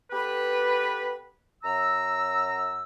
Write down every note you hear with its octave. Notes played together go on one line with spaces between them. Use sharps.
B3 G4 A4 B4
F#2 A#5 E6